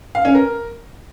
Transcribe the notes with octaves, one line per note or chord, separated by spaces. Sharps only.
F5
C#4
A#4